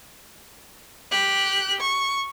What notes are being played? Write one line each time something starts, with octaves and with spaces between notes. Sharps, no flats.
G4 F#6
C#6